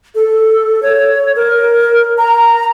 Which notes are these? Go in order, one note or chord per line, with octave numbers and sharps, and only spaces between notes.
A4
C#5
A#4
A#5